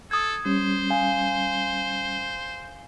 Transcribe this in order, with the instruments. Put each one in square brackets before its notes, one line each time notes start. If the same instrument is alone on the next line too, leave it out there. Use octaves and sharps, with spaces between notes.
[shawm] A4 [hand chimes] D#6 G#6
[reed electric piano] G3 C#4 [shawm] C5
[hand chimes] F5 G#5